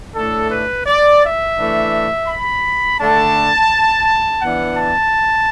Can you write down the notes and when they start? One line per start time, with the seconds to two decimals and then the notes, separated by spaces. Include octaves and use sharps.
0.15 A2 A3 D4 A4
0.50 B4
0.86 D5
1.21 E5
1.56 E3 A3 D4
2.27 B5
2.99 D3 A3 D4 A5
4.41 E3 B3 D4 F#5
4.77 A5